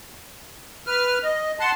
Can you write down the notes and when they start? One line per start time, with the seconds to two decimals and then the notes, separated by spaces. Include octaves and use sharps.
0.87 B4 F6
1.24 D#5
1.60 F#5 A5 C6